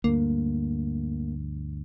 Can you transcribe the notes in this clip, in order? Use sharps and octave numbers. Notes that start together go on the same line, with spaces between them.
D2 G2 A#3